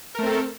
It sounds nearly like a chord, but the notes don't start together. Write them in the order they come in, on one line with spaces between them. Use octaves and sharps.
A#4 A3 C4 A4